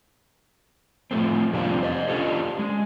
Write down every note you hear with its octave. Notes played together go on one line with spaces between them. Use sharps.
A2 F3 A3 C4
F2 C3 G3 A#3 D4 F4
C5 D#5
C#4 D4 F4 G4 A4
G#3